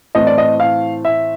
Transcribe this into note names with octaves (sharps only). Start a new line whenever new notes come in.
A2 E3 A3 C4 D#5
D5
D#5
F5
E5